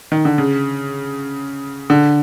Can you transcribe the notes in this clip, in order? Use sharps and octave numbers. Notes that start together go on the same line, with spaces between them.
D#3
D3
C#3
D3